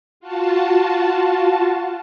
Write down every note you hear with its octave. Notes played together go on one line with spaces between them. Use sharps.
F4 F#4 A5